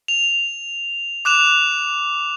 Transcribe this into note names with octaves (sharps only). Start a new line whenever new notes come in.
F7
D6 F#6 E7 F7